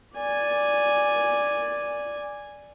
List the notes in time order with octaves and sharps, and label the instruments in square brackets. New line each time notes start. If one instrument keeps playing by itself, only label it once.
[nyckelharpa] D5 G#5